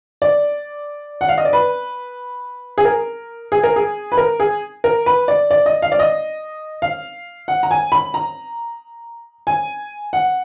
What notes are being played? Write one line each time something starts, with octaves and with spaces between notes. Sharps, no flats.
D5
F#5
F5
D#5
D5
B4
G#4
A#4
G#4
A#4
G#4
B4
A#4
G#4
A#4
B4
D5
D5
D#5
F5
D5
D#5
F5
F#5
A#5
G#5
B5
A#5
G#5
F#5